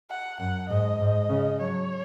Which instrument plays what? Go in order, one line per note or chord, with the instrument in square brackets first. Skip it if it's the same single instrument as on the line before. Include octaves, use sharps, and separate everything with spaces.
[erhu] F#5
[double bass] F#2 [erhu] F#5
[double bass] G#2 [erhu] D#5
[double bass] G#2
C#3
[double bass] F#3 [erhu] C#5